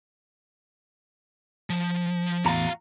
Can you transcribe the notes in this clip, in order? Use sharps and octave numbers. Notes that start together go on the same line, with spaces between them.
F3
E2 A2 F#4 F5 A#5